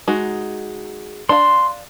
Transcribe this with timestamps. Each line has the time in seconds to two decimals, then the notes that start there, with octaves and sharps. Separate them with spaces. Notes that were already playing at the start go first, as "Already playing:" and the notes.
0.08 G#3 D#4 F#4
1.29 D4 F5 C6